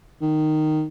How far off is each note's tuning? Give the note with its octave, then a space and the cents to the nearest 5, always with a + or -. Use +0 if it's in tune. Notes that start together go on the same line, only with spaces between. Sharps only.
D#3 -10